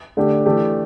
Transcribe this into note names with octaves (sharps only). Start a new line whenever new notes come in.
D3 A3 D4 G4
E3 A3 D4 G4